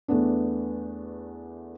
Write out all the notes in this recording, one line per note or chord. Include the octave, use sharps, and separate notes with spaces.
E2 A3 B3 D4